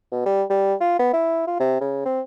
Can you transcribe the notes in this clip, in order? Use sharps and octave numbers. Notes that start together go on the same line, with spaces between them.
B2
G3
G3
F4
B3
E4
F4
C3
C#3
C4